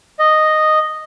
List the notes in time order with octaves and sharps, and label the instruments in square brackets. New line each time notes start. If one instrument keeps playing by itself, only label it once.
[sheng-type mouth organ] D#5